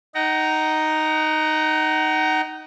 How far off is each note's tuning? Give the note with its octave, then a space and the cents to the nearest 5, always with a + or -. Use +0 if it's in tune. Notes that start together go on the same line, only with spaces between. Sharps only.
D#4 +0 F#5 +35 A#5 +0